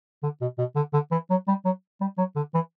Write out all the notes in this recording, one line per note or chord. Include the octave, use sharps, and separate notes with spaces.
D3
B2
B2
D3
D3
E3
F#3
G3
F#3
G3
F#3
D3
E3